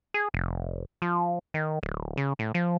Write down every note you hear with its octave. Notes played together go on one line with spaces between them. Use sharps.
G#4
F1
F3
D#3
D1
C#3
A2
F3